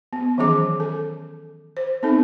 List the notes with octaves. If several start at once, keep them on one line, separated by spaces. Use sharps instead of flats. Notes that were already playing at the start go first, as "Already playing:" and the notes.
B3
D#3 E3 F#3 C#4 G#4 D6
A4
C5
B3 C4 D#4 A4